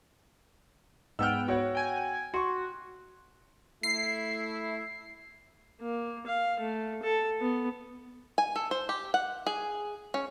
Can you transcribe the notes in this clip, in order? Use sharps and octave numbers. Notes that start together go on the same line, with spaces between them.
G#2 B3 G5 E6 F6
F#4 C#5 F#5
G5 G#5
F#4 C6 C#6
A3 E4 C7
A#3
F5
A3
A4
B3
G#5
A4
C5
G4
F#5
G#4
C#4